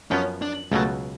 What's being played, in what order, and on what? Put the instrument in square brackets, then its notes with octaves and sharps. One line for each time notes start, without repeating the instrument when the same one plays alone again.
[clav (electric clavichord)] F#2 F3 B3 [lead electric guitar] C#4
[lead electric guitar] D4
[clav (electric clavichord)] C#2 B2 F#3 [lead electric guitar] A3